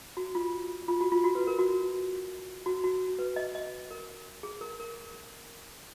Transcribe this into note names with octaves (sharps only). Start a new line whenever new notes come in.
F#4
F4
F4
F#4
F4
F#4
B4
A#4
F#4
F#4
F#4
B4
D#5
D#5
A#4
G#4
A#4
A#4